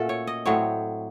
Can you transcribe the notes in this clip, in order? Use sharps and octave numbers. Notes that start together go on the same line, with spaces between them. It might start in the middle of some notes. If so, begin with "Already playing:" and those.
Already playing: A#2 A3 C#4 F#4 A4
C#5
D#5
A2 F#3 C4 C#5